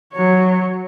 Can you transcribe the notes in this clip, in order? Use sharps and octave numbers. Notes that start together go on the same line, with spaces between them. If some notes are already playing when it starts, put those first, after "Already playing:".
F#3 C#5